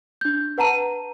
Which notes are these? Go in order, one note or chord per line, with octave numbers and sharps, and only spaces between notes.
D4 G6
B4 F#5 A5 A#5 D#7